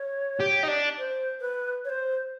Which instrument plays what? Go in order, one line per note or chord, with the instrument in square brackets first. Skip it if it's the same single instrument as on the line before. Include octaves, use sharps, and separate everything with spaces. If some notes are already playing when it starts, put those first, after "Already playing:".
Already playing: [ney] C#5
[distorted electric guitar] G4
D#4
D4
[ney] C5
B4
C#5
C5